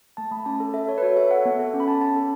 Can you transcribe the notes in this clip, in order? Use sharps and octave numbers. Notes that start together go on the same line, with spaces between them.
A3 A5
A3 B5
C#4 A5
A4
A4 E5
A4 C#5
B4
F#4 C#5
A4 E5
A4 F#5
B3
A4
C#4
B5
C#4 A5
C#4 A5
A4